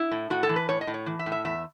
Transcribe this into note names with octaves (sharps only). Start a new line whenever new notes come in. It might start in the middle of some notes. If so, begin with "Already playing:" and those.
Already playing: E4
A2
A2 F#4
A4
E3
B4
A2 C#5
D#5
A2
C#5
E3
E5
A2
E5
E2 E5